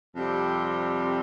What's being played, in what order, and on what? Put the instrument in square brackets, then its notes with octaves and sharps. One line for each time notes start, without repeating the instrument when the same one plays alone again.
[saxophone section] F2 C3 G3 C4